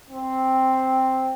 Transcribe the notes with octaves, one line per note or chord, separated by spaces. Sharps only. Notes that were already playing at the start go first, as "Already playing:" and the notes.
C4